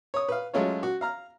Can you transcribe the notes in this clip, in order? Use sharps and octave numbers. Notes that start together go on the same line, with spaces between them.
C#5 D#6
B4 F5
F#3 G#3 A3 C#4 F4 C#5
F#4
F5 A#5 F6